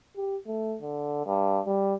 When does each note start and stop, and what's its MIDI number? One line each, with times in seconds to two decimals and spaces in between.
0.16 0.37 67
0.47 0.77 57
0.82 1.23 50
1.26 1.60 43
1.66 1.94 55